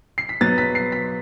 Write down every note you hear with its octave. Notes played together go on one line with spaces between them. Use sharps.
C7
B6
B2 F#3 B3 A6
B6
C7
B6